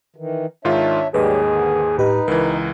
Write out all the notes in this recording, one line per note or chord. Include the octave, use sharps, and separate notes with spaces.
D#3 E3
G#2 D#3 D4 F4 C#5 E5
D#2 G#2 F#3 G3 G4 G#4 B4 D#5
D3 D#3
A2 D#4 G4 B4 D#5
C#2 E3 A#4